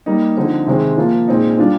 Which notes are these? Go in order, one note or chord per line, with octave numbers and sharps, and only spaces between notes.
G3 A#3 D#4
D3 F3 C4 D#4
C3 D#3 G#3 C4
F3 A#3 F4
A#2 G#3 C4 D#4
G3 D4 F4